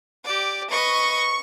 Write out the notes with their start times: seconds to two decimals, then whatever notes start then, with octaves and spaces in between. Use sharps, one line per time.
0.25 G4 D5
0.70 B4 D#5 C#6